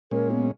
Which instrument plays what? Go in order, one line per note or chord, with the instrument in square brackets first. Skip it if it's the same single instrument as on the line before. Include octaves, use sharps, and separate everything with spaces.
[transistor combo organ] A#2 G#3 C#4 [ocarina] A#4
[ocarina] B3